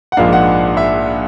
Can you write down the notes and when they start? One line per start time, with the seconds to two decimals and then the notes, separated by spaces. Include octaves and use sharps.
0.12 F#5
0.17 A#1 G#2 F3 A#3 D4 F5
0.33 F#5
0.77 E5